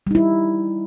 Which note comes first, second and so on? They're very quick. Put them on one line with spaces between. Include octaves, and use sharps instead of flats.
G3 D#4 E4